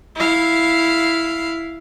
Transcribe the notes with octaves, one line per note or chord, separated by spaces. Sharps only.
E4 F5